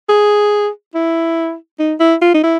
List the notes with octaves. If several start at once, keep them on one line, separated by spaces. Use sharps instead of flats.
G#4
E4
D#4
E4
F4
D#4
E4